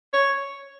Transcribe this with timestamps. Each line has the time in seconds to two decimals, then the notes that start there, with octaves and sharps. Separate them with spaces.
0.13 C#5